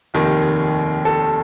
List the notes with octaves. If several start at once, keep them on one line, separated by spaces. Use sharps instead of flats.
F1 D#2 D#3
A4